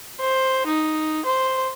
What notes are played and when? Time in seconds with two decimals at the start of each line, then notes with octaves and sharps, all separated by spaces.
0.20 C5
0.67 D#4
1.25 C5